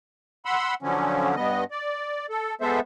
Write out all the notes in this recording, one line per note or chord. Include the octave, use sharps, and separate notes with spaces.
F#5 B5 C6 E6
D3 F3 F#3 C#4
G2 B3 D#5
D5
A4
G#3 B3 A4 C5 E5